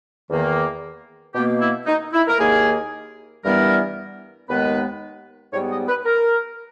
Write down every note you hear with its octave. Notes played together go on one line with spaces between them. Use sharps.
E2 D#3 A#3
B2 A#3 G4
E4
D#4
E4
A#4
D#2 D#3 A#3 G#4
G2 E3 G3 B3 A#4
D#2 D#3 G#3 B3 B4
G#2 G3 B3 C#5
D#5
B4
A#4